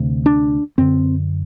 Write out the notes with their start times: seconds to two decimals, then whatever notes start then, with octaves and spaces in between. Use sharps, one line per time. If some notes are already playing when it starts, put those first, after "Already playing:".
Already playing: D2 C3
0.26 D4
0.78 F#2 D3 C4